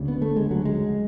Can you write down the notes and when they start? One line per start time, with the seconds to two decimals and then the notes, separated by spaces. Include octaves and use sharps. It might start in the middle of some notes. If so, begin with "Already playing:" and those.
Already playing: D2 C#3
0.08 B3
0.22 A3
0.37 G#3
0.51 F#3
0.65 G#3